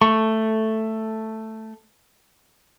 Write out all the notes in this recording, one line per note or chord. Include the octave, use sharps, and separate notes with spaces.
A3 C#6